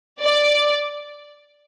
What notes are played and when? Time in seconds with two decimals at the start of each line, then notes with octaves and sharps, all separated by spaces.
0.23 D5